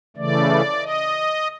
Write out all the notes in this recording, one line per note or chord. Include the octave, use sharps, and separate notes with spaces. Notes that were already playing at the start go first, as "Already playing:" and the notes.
C#3 E3 A3 D5
D#5